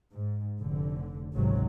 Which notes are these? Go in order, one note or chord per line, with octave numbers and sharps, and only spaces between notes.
G#2
F1 D3
G#1 C#2 C3 F#3